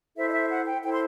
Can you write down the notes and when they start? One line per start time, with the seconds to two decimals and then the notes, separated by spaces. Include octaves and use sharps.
0.17 E4 A4 C5 E5
0.29 D#5
0.33 E5
0.49 F#5
0.66 G5
0.83 E4 A4 C5 G5
0.91 C6